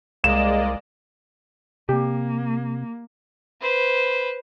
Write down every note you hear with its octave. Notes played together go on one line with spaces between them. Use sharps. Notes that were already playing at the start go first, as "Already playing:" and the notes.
C2 G#3 A#3 D5 D#5 E7
C3 A#3 G4
B4 C5